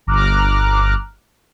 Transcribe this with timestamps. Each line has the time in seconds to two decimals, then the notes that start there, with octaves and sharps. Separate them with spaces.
0.07 G1 A#5 D6 F6 F#6